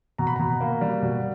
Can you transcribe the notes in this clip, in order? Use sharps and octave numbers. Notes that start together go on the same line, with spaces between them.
B2 A#5
B5
B2 A#5
A#3
G3
B2